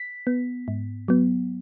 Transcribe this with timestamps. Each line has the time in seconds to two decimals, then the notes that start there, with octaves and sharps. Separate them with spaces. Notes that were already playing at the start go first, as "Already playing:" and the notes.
Already playing: B6
0.27 B3
0.68 G#2
1.08 F#3 B3